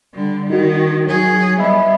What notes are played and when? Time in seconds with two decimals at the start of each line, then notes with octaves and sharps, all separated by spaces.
0.15 D3 G3
0.50 D#3 D#4 F#4
1.07 F#3 G#4
1.58 G3 B3 D#5 E5 B5